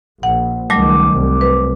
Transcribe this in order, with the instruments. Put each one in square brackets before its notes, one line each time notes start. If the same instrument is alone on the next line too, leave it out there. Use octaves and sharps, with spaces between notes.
[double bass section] A#1 [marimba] F#5
[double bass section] C#2 D#3 [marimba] F#3 G3 A3 [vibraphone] D6
[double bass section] C2
[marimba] B4